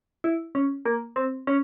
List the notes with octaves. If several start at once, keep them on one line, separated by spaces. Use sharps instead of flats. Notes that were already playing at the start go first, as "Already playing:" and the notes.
E4
C#4
A#3
C4
C#4